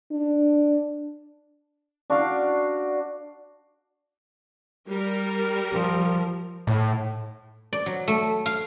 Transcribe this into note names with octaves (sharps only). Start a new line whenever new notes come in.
D4
D4 F#4 D5 F5
G3 A#4
F3
A2
D5
F#3
A3
F5